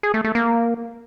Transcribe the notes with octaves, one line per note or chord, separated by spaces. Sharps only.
G#4
A3
A3
A#3